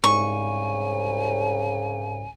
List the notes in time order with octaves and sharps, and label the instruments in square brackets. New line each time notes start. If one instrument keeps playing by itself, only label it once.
[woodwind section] C2 C#3 [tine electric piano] G#2 [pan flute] G#5 [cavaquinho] C#6